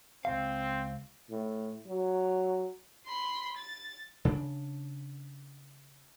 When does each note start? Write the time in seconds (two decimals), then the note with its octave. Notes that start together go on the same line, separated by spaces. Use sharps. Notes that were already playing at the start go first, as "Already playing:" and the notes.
0.25 C#2 C#3 C4 F5
1.30 A2
1.87 F#3
3.06 B5 C6
3.57 A6
4.25 C#3 D4